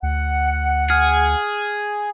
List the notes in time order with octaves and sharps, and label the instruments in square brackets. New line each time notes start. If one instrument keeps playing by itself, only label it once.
[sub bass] D2 [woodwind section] F#5
[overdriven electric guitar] G#4 [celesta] F6